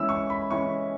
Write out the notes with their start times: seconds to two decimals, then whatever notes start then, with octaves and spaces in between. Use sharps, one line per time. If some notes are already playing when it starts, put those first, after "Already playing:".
Already playing: E3 G#3 C#4 E4 E6
0.09 C#6
0.30 B5
0.51 E3 G#3 C#4 E4 C#6